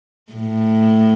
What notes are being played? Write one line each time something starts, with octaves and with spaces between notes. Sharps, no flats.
A2